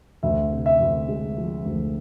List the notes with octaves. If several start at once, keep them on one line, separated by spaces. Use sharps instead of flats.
D2 E5
C3
E5
D2
G#3
F3
D2